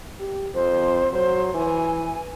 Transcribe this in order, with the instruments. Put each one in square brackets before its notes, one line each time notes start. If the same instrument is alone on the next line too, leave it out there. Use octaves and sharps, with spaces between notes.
[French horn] G4
[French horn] F2 [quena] C5
[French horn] F#3 [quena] C5
[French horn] E3 [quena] G#5